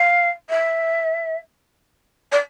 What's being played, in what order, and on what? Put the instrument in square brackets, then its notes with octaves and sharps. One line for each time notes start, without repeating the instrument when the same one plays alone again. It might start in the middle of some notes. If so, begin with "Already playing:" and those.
Already playing: [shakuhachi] F5
E5
D5